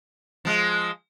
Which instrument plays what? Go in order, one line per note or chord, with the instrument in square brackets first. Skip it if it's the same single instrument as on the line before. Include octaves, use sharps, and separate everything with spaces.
[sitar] F3 G#3